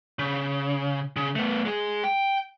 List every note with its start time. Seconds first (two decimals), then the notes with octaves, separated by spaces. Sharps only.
0.19 C#3
1.16 C#3
1.36 A3 B3
1.66 G#3 G#4
2.04 G5